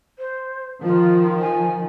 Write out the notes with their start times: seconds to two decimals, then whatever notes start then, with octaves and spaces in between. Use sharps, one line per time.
0.19 C5
0.83 D#3 F3 F4
1.40 G#5